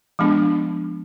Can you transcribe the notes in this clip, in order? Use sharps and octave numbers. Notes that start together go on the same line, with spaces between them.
F3 G#3 B3 D4